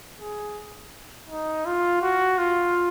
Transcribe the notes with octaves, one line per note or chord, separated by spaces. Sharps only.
G#4
D#4
F4
F#4
F4